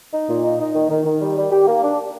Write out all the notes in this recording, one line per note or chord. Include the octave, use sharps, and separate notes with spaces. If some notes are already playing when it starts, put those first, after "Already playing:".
D#4
A#2
D#4
D#4
D#3
D#3
D#3
G3
G3
G4
A#3
D4